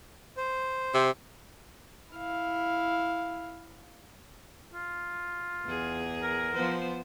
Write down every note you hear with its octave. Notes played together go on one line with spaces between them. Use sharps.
C5
C3
E4 F5
F4
E2 G#4
A#4
F3 B3 C5